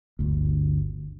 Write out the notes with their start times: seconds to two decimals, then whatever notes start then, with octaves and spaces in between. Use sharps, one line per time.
0.19 G1 D2